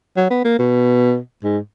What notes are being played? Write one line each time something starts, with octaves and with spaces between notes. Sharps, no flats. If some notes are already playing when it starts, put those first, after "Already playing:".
F#3
B3
A#3
B2
G#2